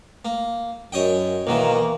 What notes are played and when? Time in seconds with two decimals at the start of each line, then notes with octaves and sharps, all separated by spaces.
0.25 A#3
0.92 F#2 C#5 D#5 G5
1.47 B1 D#3 E3 A#3